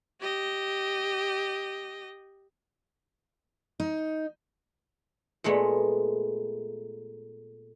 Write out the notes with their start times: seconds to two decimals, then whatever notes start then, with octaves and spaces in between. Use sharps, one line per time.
0.20 G4 D#5
3.80 D#4
5.44 A#2 G#3 A3 B3